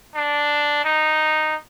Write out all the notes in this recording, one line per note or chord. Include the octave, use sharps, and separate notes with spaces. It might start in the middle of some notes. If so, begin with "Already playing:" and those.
D4
D#4